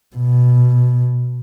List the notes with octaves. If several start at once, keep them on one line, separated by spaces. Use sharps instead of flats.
B2